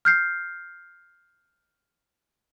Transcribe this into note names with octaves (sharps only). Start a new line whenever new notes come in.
F6 G6 C7